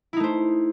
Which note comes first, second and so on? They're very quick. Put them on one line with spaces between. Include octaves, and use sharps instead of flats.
E4 D#4 A3 C5